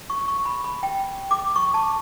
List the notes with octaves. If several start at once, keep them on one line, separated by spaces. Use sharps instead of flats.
C#6
C#6
B5
B5
G5
D6
C#6
A5